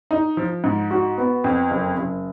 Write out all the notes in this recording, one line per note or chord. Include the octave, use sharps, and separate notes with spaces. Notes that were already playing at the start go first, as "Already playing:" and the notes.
D#4
F3
G#2
F#4
B3
F2
F#1
F#1